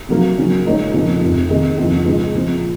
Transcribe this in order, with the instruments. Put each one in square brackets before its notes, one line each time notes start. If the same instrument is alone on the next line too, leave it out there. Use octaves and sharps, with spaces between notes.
[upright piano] C3 F#3 A#3
C#3 F#3 C#4
A#2 G#3 D#4 A#4 C#5
F1 F2 C#3 F3
F1 F2 C3
C3 D#3 A#3 D#4 G#4
F2 C#3 F3
C#2 C#3 G#3
A#2 F3 C4